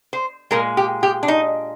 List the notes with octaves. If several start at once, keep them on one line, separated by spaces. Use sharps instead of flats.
C5
A#2 G#3 A#4
G4
G4
D4
D#4